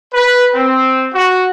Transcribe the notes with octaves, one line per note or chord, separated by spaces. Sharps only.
B4
C4
F#4